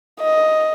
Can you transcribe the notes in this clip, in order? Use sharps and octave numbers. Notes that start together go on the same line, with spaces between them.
D#5